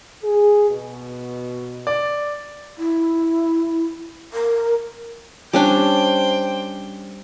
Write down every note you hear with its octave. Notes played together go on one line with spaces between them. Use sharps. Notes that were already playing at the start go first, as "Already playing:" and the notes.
G#4
B2
D5
E4
A#4
G3 C#4 D4 C5 G5